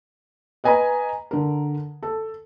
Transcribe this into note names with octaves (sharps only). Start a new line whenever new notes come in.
B4 D#5 G#5 A#5 B5
D3 A#4
A4